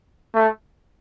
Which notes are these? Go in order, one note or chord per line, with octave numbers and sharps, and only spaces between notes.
A3